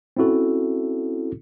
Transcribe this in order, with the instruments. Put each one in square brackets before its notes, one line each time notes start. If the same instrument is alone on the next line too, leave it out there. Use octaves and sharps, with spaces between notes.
[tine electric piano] C4 C#4 E4 F#4 A4